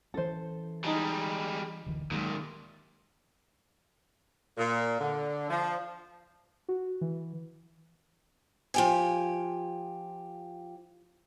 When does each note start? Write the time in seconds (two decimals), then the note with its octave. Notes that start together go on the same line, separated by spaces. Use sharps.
0.14 E3 C#4 A4 C5
0.84 G3 G#3 D#4 A5
1.86 D1 D3 E3
2.11 D#2 A#2 D#3 F#3 G#3
4.58 A#2
5.00 D3
5.50 F3
6.69 F#4
7.01 E3
8.74 F3 G4 G#5